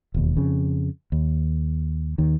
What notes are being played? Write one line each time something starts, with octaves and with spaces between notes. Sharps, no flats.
E1 D#2
F2 C#3
D#2
D#2 D#3